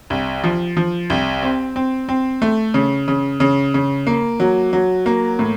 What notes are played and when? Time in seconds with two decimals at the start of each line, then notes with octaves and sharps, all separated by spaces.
0.10 C2
0.44 F3
0.77 F3
1.10 C2
1.43 C4
1.76 C4
2.09 C4
2.42 A3
2.74 C#3
3.08 C#3
3.40 C#3
3.74 C#3
4.07 A#3
4.40 F#3
4.73 F#3
5.06 A#3
5.39 A2